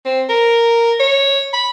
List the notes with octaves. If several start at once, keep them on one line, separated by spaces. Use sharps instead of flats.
C4
A#4
C#5
B5